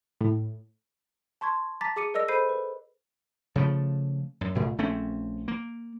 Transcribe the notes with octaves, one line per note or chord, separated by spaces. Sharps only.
A2
A5 C6 C#6 G#6
A5 A#5 D6 A6 B6
G#4 D6 C#7 D#7
A#4 D5 D#5 E6 A#6
A4 C5 B5 G6 C7 D#7
B4
C#3 F3 A3
F#2
C2 A#2 A3
A#1 A3 C4 C#4
A#3